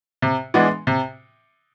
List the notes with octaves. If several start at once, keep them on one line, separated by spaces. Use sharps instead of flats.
C3
E3 G#3 B3 D4
C3